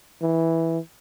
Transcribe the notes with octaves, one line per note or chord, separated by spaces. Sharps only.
E3